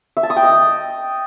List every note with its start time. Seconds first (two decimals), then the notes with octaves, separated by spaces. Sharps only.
0.17 E5
0.23 A5
0.30 D#6
0.37 G5
0.43 D#5